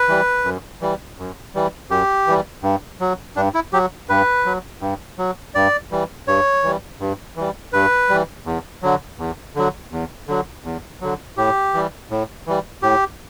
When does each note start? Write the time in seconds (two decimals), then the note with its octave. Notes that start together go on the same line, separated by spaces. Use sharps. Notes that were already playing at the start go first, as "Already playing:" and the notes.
Already playing: B4
0.08 E3 G3
0.45 F#2
0.81 E3 G3
1.18 F#2
1.55 E3 G3
1.90 F#2 G4
2.27 E3 G3
2.63 G2
3.00 F#3
3.36 G2 D4
3.55 E4
3.73 F#3 G4
4.09 G2 B4
4.46 F#3
4.81 G2
5.18 F#3
5.55 G2 D5
5.91 E3 G3
6.28 G2 C#5
6.63 E3 G3
7.00 G2
7.37 E3 G3
7.73 G2 B4
8.09 E3 G3
8.46 E2
8.82 D3 F#3
9.19 E2
9.55 D3 F#3
9.92 E2
10.28 D3 F#3
10.64 E2
11.01 D3 F#3
11.37 A2 G4
11.74 E3 G3
12.11 A2
12.46 E3 G3
12.82 A2 G4